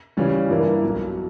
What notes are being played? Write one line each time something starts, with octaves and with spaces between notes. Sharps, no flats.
C#3 E3 G3 C#4
G2 E3 A#3 E4 A#4
B1 B2 F#3